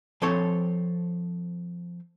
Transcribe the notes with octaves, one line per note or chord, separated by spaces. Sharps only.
F3 C4 A4 C5 C#5